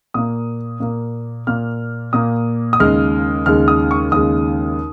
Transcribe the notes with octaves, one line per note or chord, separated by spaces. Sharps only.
A#2 A#3 D#6
A#2 A#3
A#2 A#3 F6
A#2 A#3 D#6
D#6
D#2 C#3 G#3 F6
D#2 C#3 G#3 F6
D#6
C#6
D#2 C#3 G#3 D#6